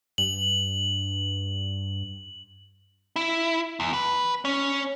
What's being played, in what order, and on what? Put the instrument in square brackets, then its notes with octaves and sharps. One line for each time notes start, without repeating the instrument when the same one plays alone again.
[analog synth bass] G2 [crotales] F#7
[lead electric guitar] E4
E2
B4
C#4